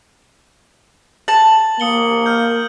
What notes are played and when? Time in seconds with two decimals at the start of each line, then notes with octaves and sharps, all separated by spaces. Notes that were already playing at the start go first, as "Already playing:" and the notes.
1.28 A5 F#7
1.80 A#3 D#6 C#7 G7
2.26 F6 G6